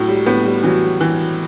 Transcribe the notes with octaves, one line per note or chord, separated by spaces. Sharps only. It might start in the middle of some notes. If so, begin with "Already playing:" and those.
Already playing: A2 F#3
G3
A2 B3
G3
E3 F#3
E3